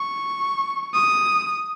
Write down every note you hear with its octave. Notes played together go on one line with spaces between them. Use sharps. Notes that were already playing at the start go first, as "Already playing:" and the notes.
Already playing: C#6
D#6